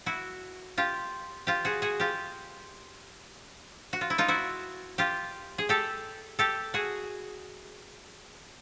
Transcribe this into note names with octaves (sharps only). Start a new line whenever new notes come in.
E4 F#4
F4 G4
F4 G4
F#4 G#4
F#4 G#4
F4 G4
F#4
F4
E4
D#4 F4
E4 F#4
F4 G4
G#4
G4 A4
G4 A4
F#4 G#4